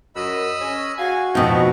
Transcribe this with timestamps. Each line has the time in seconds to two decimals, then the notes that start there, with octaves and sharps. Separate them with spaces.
0.16 F#2 D#5 B5 E6
0.62 C#4
0.98 F#4 F5 G#5
1.35 F2 B2 C4 D#4